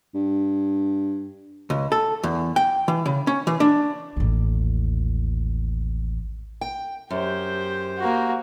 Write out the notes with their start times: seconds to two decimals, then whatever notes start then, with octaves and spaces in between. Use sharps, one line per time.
0.15 G2
1.70 C#2
1.92 A4
2.23 E2
2.56 G5
2.88 E3
3.06 C#3
3.27 C#4
3.47 E3
3.60 D4
4.16 A1 D#2
6.61 G5
7.10 F#2 G4 C5
7.99 A#3 F#4